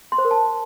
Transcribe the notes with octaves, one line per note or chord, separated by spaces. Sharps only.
C6
C5
A#4
A5